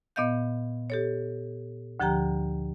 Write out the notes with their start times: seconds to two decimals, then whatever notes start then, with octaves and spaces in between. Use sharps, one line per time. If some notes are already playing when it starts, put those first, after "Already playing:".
0.16 A#2 B3 D#5 F5 G6
0.90 G4 A4 C#5
2.00 D2 D3 F3 G4 G5 A#5